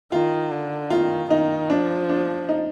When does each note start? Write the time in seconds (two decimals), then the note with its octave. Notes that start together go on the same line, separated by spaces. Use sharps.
0.12 D#3 F4
0.51 D3
0.90 D#3 F4
1.30 D#3 D#4
1.70 F3 D4
2.09 D4
2.49 D#4